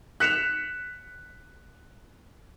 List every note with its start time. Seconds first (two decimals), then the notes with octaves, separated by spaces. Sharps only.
0.20 F#6 B6 C#7 E7 F7